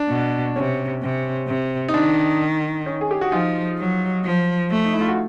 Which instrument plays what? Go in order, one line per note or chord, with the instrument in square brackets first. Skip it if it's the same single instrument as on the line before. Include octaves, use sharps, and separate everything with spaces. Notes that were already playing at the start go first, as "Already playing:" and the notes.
Already playing: [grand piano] D4
[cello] B2
[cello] C3 [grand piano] C#4
[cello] C3
C3
[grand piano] D#4
[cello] D#3 [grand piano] D4
[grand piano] C#4 D#4
G#4
G4
F#4
[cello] F3 [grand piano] D#4 F4
[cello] F#3
F3
A3
[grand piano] D#4
E4
F4
F#4